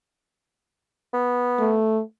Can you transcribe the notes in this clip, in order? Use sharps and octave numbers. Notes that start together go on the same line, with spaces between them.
B3
A3